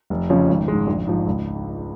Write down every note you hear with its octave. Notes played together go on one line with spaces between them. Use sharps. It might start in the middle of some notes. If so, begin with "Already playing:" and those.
F1
F2 C#3 F3 C#4
G#1
G#2 G#3
A#1
G#2 F3
C#2